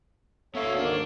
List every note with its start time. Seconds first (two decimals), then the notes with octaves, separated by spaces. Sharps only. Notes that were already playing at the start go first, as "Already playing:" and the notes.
0.55 D2 B3 A4 C#5 E5 F5
0.77 G#2 D#3 A#3 D4